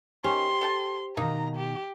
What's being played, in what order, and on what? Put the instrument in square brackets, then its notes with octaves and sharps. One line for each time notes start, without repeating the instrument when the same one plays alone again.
[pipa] D#3 C#4 [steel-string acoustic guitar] G4 C5 [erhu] C6
[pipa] A4 G5 A5
[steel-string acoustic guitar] B2 D#3 [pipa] A#3 D#4 [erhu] A#5
[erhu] G4